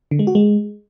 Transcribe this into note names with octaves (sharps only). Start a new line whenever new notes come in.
D3
G#3
F#4
G#3